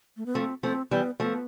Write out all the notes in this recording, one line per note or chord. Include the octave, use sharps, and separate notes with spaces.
A3
B3
F3 A3 C4
F3 A3 C4
E3 G3 B3
F3 A3 B3